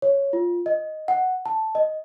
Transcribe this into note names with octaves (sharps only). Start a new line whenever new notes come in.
C#5
F4
D#5
F#5
A5
D#5